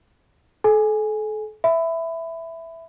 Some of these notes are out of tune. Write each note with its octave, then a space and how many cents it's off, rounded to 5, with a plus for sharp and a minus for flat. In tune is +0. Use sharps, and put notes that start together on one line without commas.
A4 -40 G#5 +0
E5 +0 B5 +20